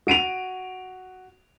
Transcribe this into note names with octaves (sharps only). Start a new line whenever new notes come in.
F#4 D7 D#7 F7